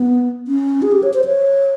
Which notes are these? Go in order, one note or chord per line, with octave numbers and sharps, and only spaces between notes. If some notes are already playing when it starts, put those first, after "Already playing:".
Already playing: B3
C#4
G#4
G4
C#5
C5
C#5